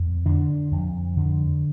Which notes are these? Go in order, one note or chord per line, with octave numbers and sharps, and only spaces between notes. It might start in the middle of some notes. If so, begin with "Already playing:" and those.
Already playing: F2
D3 D4
F2
D3